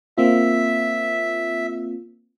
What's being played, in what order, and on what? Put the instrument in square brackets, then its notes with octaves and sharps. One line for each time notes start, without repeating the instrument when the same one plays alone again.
[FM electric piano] A#3 C4 F4 [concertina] E5